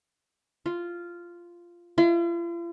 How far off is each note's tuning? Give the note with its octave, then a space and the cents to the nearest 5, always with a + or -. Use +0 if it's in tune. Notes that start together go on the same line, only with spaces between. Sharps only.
F4 -10
F4 -45